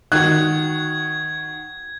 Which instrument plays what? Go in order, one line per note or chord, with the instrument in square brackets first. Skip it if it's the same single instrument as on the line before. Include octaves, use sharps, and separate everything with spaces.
[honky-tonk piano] D#3 F#4 [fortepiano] F#6 [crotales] G#6